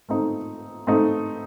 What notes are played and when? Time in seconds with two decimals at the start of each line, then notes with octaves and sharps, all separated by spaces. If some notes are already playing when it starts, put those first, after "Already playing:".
0.09 A3 C4 D#4
0.87 A3 C4 D#4